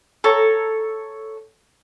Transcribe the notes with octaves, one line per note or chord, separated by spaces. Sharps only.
A4 C#5 A#5